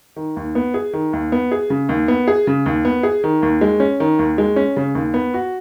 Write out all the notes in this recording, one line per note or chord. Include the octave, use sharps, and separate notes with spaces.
D#3
D#2
B3
G#4
D#3
D#2
B3
G#4
C#3
D#2
B3
G#4
C#3
D#2
B3
G#4
D#3
D#2
G#3
C#4
D#3
D#2
G#3
C#4
C#3
D#2
B3
F#4